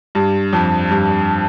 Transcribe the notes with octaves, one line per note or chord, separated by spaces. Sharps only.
G2
F2
G2